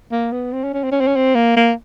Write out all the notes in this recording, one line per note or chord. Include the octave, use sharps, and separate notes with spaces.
A#3
B3
C4
C#4
C#4
C4
C#4
C4
C#4
C4
A#3
A#3